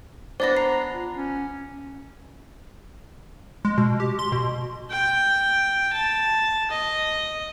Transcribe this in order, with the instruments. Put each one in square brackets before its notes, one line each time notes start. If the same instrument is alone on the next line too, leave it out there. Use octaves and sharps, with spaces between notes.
[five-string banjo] B3 D4 [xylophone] C5 A6 A#6
[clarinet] A#5 [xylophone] C7
[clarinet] F4
C#4
[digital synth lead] G#3
B2
G4
C6
B2
[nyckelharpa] G5
A5
D#5